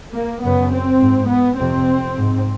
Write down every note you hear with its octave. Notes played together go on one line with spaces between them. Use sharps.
A#3
F#2 C#3 B3
C4
G#2
B3
F2 C3 C4
G#2